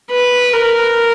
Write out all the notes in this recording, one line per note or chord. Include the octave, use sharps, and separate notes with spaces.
B4
A#4